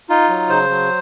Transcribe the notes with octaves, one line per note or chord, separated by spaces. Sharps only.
D#4 F4
F#3
C#3 C5
F#3